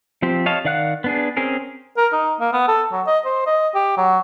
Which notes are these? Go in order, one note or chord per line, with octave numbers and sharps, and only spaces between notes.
F3 C4 G4
C#5 D#5 F5 A5
D#3 D5 F5 F#5 F#6
B3 D4 G#4
C4 C#4 G#4 A#4
A#4
D#4
A#3
B3
A4
F#3
D#5
C5
D#5
G4
F#3